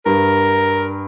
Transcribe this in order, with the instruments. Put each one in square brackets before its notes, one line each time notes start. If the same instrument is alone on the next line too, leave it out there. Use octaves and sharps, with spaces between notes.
[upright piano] G2 [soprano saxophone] A#4